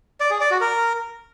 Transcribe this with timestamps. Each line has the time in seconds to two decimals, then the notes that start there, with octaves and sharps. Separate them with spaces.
0.20 D5
0.31 G#4
0.41 D5
0.51 F#4
0.61 A#4